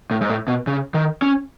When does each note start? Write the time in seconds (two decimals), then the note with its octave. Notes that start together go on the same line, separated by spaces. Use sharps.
0.11 A2
0.21 G#2
0.29 A2
0.48 B2
0.67 C#3
0.94 D#3
1.22 C#4